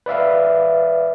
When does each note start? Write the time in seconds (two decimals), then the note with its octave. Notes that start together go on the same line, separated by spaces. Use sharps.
0.06 B4 D5 E5 F5